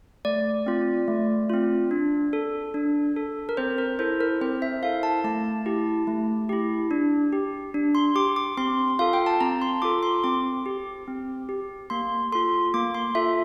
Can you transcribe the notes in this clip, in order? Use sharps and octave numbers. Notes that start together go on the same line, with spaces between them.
A3 D5
C4 F4
A3
C4 F4
D4
A4
D4
A4
A#4
C4 C5
A#4
E4 A4 C5
A#4
C4 C5
E5
E4 A4 F5
A5
A3 A5
E4 G4
A3
E4 G4
D4
G4
D4
C6
G4 D6
D6
C4 C6
F4 A4 F5
G5
A5
C4 A#5
C6
F4 A4 D6
C6
C4 D6
G4
C4
G4
A#3 C6
F4 A4 C6
A#3 D6
C6
F4 A4 E5